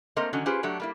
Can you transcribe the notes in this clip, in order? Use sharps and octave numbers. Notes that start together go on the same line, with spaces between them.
A3 A#3 C4 A#4 C5 D#5
D3 D#3 F#3 C#4
C#4 F4 G4 G#4 B4 C5
F#3 A3 D4 F#4 G4
G3 A#3 E4